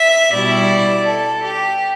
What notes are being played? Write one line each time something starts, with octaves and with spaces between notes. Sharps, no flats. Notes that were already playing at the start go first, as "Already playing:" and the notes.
Already playing: E5
B2 G3 E4 D5
A4
G4